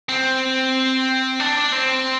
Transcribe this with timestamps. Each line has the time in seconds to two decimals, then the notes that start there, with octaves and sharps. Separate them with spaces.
0.09 C4
1.40 D4
1.72 C4